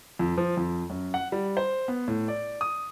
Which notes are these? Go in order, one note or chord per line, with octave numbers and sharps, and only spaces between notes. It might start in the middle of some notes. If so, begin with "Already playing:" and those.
F2
F3
F2
F#2
F#5
G3
C5
B3
A2
D5
D#6